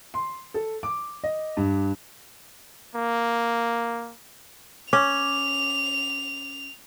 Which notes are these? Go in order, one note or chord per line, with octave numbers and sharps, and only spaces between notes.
C6
A4
D6
D#5
G2
A#3
C#4 D6 F7